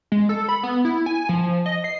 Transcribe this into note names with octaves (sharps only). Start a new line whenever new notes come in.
G#3
A4
B5
B3
E4
G#5
F3
D#5
C7